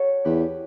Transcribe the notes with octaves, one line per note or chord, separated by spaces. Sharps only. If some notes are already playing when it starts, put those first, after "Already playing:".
Already playing: F#4 A4 C#5
E2 G4 B4